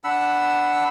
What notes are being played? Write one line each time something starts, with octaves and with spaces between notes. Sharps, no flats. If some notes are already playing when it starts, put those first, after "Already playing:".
D4 F#5 B5 E6